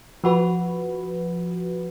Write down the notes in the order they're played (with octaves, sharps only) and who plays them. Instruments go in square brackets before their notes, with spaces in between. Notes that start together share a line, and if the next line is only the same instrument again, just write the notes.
[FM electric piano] F3 F#4 B4